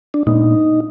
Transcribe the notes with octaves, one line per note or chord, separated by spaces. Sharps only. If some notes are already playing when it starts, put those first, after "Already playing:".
D4
A#2 G#3 B3 D4 D#4